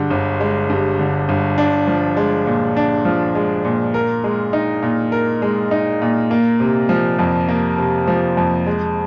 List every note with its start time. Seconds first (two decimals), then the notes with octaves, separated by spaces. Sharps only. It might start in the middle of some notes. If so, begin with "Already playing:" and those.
Already playing: G2 D3 G#3
0.10 G1
0.40 G#3
0.70 G2
0.99 D3
1.29 G1
1.58 D4
1.87 F3
2.17 G#3
2.46 A#2
2.77 D4
3.05 F3
3.35 G#3
3.65 A#2
3.94 A#4
4.24 G#3
4.53 D#4
4.83 A#2
5.12 A#4
5.42 G#3
5.71 D#4
6.02 A#2
6.31 A#3
6.60 C3
6.89 F3
7.19 F2
7.48 A#3
7.78 C3
8.08 F3
8.37 F2
8.66 G#3